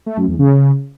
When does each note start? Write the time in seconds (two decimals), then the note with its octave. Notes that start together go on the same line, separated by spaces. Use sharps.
0.06 A3
0.17 F#2
0.28 E2
0.39 C#3